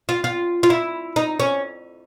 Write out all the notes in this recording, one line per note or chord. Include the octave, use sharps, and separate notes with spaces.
F4
F4
F4
E4
D#4
C#4